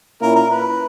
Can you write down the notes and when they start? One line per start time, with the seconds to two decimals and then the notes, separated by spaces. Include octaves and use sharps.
0.21 A#2 A#3 C#4 E4 A#4
0.35 A#4
0.50 B4